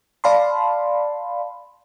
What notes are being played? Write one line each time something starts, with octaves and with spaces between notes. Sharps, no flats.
D5 F5 A5 B5 C6